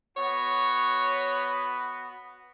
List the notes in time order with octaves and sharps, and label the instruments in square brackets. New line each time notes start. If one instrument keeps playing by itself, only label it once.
[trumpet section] B3 F#4 [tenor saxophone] C#5